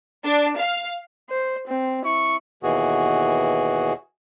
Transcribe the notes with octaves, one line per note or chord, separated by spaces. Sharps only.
D4
F5
C5
C4
E4 C#6
D#2 B2 E3 F#4 G#4